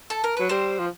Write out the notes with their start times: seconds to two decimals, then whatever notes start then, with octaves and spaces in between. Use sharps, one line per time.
0.10 A4
0.24 A#4
0.37 F#3 B4
0.49 G3 C4 C5
0.79 F3